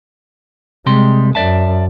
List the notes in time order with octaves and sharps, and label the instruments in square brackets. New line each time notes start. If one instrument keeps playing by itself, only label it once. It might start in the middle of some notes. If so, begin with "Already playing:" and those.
[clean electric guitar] C3 G3 C6 [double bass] G#3
[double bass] F#2 [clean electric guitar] D5 E5 A5